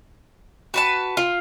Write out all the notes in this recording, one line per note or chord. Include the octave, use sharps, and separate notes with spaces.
F#4 B4 A5
F4